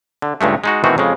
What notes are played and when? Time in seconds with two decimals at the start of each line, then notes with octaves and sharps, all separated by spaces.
0.22 D3
0.41 C#2 G2 G#3 A3
0.64 G#3 D#4 F#4
0.84 B2 D#3 E3 A3 C4 F#4
0.98 F2 C#3 G#3